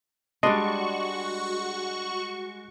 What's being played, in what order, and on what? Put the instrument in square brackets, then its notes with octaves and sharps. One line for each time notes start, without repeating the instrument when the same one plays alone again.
[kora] G3 D4 [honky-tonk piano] G#3 [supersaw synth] F#4 C#6 [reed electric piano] D#5 C6